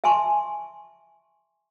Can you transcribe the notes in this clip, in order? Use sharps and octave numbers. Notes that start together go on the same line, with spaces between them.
E5 G#5 A5 C6 C#6